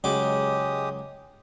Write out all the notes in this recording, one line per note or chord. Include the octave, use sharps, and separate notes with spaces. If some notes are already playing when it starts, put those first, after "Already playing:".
C#2 F#3 G#3 G4 D6 D#6